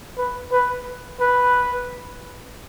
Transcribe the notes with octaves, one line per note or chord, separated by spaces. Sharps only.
B4
B4
B4